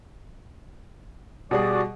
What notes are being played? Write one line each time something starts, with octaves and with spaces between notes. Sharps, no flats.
B2 G3 F#4 G#4 D5